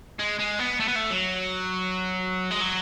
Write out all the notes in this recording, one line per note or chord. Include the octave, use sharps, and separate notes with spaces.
G#3
G#3
B3
A3
B3
A3
F#3
G#3
F#3